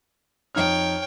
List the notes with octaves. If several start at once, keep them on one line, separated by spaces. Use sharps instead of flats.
F2 D#4 C#5 G5 F6